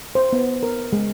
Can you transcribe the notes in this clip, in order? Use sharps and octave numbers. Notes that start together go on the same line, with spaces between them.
C5
B3
A#4
G#3